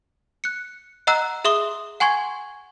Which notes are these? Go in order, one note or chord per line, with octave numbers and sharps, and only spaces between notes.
F#6 C#7
D#5 F#5 A#5 E6 F#6
G#4 E5 C6 D#6 G7
F#5 G#5 C6 C#6 G#6